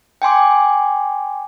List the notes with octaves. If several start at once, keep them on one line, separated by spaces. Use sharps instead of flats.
G5 G#5 C6 D6